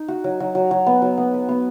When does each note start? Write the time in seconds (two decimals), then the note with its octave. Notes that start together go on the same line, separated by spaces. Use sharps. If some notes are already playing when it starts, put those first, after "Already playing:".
Already playing: D#4
0.08 F#4
0.24 F#3
0.40 F#3
0.55 F#3
0.71 F#3
0.87 B3
1.02 F#3
1.18 B3
1.34 B4
1.49 B3